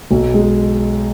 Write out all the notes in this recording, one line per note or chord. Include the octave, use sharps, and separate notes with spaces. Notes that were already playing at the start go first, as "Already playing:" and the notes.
B1
G#3